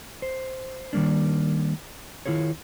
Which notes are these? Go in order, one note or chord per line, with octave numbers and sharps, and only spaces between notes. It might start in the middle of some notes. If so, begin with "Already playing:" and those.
C5
D#3 G3 A#3 D4
D#3 F3 E4 F4 G#4 C#5